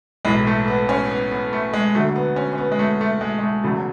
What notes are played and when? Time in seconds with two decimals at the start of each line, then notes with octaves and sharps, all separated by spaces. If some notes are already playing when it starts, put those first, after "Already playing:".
0.25 B1 A2 E3 G#3
0.47 A3
0.68 B3
0.89 C#4
1.09 B3
1.31 B3
1.53 A3
1.73 G#3
1.95 D2 D3 F#3 A3
2.16 B3
2.36 C#4
2.53 C#4
2.58 B3
2.72 G#3
2.79 A3
3.01 A3
3.21 G#3
3.39 G#3
3.43 A3
3.64 E1 E2 C#3 F#3 A3